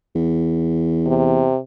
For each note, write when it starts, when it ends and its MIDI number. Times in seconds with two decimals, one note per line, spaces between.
0.15 1.49 40
1.07 1.58 48